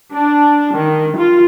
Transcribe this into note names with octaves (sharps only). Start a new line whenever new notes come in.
D4
D#3
F4